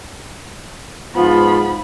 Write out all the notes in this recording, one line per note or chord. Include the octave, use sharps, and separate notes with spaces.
G#2 F3 B3 F4 B5